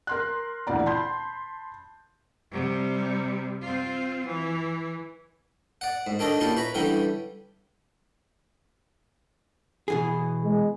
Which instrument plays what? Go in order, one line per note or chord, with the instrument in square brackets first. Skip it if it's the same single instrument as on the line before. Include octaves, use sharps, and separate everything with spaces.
[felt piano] A#4 C6 F#6
D2 A#2 E3 D5 A#5
A5 B5 C6 G6
[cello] C3 G3
C4 F4
E3
[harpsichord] D5 F#5
G#2
D#3 D4 A4 C#5 D#5
A#2 C#4 E4 G4 A5
B4 C#5 A#5 B5
D3 E3 G3 C#4 E4 G4
[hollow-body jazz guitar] B2 E3 G#4
[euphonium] G#3